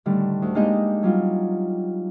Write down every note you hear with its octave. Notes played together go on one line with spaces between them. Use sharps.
A2 D3 D#3 G3
D2
G#3 A#3 D4 D#4 G4 D#5
F#3 G3 F4